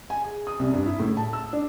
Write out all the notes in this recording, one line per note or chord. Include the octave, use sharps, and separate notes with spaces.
G#5
G#4
D#6
C2
G2
E4
A2
A5
E6
D4